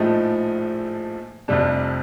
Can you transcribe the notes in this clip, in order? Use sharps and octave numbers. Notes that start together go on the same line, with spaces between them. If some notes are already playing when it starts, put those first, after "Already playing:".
Already playing: A#1 A2 F3 A3 D#4
F1 F2 C3 G3 D4